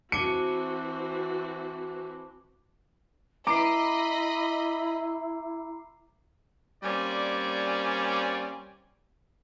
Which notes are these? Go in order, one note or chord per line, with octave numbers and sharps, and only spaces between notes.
E3 C4 F#4 A5 D6 C#7 G7
E4 D#5 A#5 B5 D6 C7
G3 A#3 C4 C#4 D5